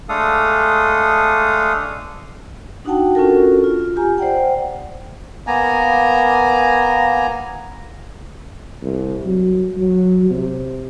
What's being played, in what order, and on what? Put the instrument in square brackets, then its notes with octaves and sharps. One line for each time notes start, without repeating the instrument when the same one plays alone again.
[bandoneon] G#3 A3 D4 A4 F5 D#6
[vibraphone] D4 D#4 F#4 F#5 G5 A5
C#4 D4 F4 F#4 A4 A#4
F4
F4 G4 G#5 A#5
C5 D5 F#5 G5
[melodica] A#3 B3 G#5 A#5
[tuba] C2
F#3
F#3
C3